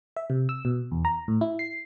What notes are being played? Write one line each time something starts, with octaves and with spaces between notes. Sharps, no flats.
E5
C3
E6
B2
E2
A#5
A2
E4
C7